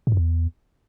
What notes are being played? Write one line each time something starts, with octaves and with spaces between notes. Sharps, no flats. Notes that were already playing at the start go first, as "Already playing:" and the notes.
A2
F#2
E2